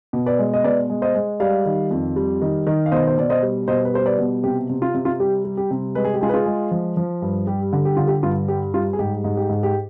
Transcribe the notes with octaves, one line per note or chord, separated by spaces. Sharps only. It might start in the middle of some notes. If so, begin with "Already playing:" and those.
B2
B4 D5
G#3
D#5
B2 B4 D5
G#3
C5 D#5
G#3
G3 D5 F5
D#3
F2
G3
D#3
D#3
F5
B2 C5 D#5
C5
B2 D5
C5 D#5
G3
B2 C5 D#5
B4
G3 C5
B4 D5
B2
C3 G4
C3
F4
C3
F4
G3 G4
G3
G4
C3
G#3 B4
G#4
G4
G#3 F4 G#4
B4
F4 G#4
G#3
F3
F3
G2
G3 G4
D3
G4
D3 F4
G4
G2 F4
G3 G4
G3 F4
G#4
G#2 G4
G#2
G4
G#2
G4